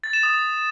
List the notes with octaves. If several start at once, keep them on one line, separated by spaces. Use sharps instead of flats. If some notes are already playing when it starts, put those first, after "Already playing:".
A6
E7
D#6